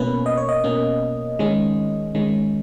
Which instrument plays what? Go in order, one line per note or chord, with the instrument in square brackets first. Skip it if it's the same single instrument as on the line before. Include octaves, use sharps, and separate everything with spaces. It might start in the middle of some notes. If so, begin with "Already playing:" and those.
Already playing: [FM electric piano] B2 A#3 C#4 B4
D#5
C#5
D#5
B2 A#3 C#4
D#3 G#3 C#4
D#3 G#3 C#4